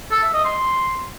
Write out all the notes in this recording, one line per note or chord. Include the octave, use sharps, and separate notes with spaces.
A4
E5
D#5
C6